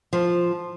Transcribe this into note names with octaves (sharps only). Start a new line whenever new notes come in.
F3